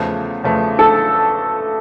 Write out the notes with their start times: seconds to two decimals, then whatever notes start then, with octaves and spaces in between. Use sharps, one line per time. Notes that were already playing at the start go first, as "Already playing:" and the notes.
Already playing: E2 C#3 F3 A3
0.44 E2 C#3 F3 A3
0.79 A4